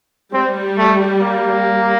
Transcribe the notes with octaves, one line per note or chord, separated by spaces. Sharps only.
G3 C4
A3
A#3